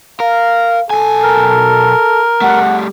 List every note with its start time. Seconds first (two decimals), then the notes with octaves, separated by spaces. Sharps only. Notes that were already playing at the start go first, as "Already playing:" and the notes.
0.20 A#4 F5
0.90 B1 A4 G#5
1.23 A#4
2.41 G3 A3 F#5